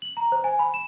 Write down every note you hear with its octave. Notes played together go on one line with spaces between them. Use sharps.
F#7
A#5
C5
G#5
B5
E7